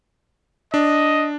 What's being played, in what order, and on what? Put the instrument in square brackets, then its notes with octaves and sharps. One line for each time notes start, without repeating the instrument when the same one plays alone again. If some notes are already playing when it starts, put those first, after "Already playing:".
[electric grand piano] D4 [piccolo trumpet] D#5